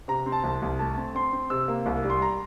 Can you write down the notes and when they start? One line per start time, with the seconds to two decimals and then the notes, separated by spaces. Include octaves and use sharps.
0.08 C3 A#5
0.26 C4
0.32 A5
0.44 C2
0.62 C2
0.79 A3 A5
0.97 C4
1.15 C4 C6
1.33 C4
1.50 C3 E6
1.68 A#3
1.86 C2
2.04 G3
2.10 C6
2.22 A#5